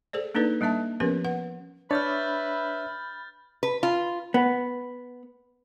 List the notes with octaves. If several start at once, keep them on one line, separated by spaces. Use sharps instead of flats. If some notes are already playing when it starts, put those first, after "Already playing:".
G#4 A4 C5 D5
A#3 D4 D#4 A4 B4 D5
G3 A#3 D4 E5 A5
F3 B3 C#4 G4 A#4 B4
B4 F#5
D4 B4 C#5 E5 B5 F6 G6 A6
B4
F4
B3